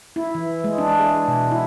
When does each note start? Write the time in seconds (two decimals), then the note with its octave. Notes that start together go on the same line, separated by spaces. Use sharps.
0.16 E4
0.35 E3
0.64 G#3
0.78 D4
0.99 G#4
1.28 B2
1.52 E4